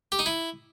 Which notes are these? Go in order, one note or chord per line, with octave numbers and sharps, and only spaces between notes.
G4
D#4
E4